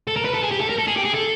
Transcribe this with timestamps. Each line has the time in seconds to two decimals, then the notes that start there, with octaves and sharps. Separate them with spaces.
0.08 A4
0.16 A#4
0.25 B4
0.34 A4
0.43 G#4
0.51 G4
0.61 A4
0.70 A#4
0.78 A4
0.87 G#4
0.96 G4
1.05 G#4
1.14 A4